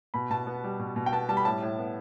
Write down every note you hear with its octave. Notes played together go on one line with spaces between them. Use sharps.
B2 B5
B2 A5
B3
G3
B2
B2
G5
B3 A5
G3 A5
B5
A2 A5
A2
B3